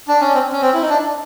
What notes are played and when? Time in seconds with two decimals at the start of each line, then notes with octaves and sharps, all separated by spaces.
0.08 D4
0.21 C#4
0.34 C4
0.52 C#4
0.61 C4
0.74 E4
0.81 D#4
0.89 D4